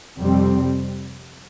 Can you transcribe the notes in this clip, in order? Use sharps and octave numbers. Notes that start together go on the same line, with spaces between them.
F2 C3 G3 C4